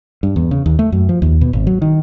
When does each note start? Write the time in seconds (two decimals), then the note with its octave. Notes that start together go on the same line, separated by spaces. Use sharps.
0.23 G2
0.36 E2
0.51 C#3
0.66 D#2
0.79 A3
0.92 F#2
1.09 F3
1.22 D#2
1.41 B2
1.53 G#1
1.67 F#3
1.82 D#3